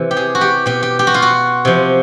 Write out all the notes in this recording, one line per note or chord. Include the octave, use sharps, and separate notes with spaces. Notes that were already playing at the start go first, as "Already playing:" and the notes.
Already playing: C3 E3
G4
G#4
F#4
G4
B2 G4
G4
G4
F#4
F4
F#4
C3 F3